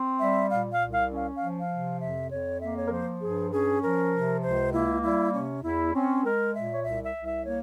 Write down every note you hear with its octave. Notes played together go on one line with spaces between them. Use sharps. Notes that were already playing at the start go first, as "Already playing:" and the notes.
Already playing: C4
G3 E5
A#2 F5
F5
C2
F5
C#4
F5
F3 F5
F5
C3
F2 E5
F2 C#5
A#3 E5
C#5
A#4
F3 C5
G2 G#4
C#4 G#4
F3 A#4
C3
C#2 C5
A#3 E4
G3 E4
C3 C#4
E2 E4
C4 C#4
G#3 A#4
A#2 E5
C#5
C2 E5
E5
C2
E5
A#3 C#5